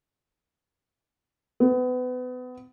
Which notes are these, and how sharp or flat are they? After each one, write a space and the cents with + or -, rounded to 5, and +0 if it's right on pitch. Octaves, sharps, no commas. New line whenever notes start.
B3 +30